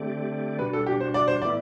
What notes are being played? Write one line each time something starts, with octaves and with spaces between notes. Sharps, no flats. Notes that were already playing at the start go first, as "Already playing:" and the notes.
Already playing: D3 A3 C4 G4 D5
B2 G3 D4 F#4 B4
A4
G4
C5
D5
C5
A2 E3 B3 E4 D5